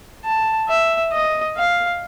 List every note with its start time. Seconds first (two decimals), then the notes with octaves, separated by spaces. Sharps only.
0.25 A5
0.68 E5
1.13 D#5
1.57 F5